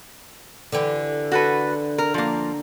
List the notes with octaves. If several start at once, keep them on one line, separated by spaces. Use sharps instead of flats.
D3 E3 G4
F#4 A4 B4
A#4
F3 A#3